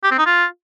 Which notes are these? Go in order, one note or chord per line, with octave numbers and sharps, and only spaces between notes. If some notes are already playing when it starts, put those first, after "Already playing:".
G4
C4
D#4
F4